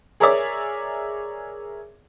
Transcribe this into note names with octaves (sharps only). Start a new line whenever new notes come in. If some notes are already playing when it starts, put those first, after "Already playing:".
G#4 A#4 C#5 D5 E5 D6